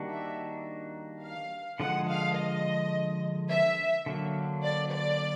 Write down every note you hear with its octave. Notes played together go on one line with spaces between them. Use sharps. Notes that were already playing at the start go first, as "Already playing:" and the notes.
Already playing: D#3 G3 A#3 D4 F#4
E5
F5
D3 F3 G#3 F#5
F5
D#5
E5
D3 F#3 A#3
D5
D5